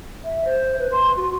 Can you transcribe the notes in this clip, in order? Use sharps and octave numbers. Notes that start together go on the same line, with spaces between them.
E5
C5
B4
C6
F#4